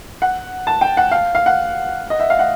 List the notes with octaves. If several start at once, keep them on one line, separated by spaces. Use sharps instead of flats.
F#5
A5
G5
F#5
F5
F5
F#5
D#5
E5
F5
F#5